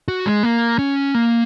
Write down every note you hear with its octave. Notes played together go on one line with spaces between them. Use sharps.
F#4
G#3
A#3
C#4
A#3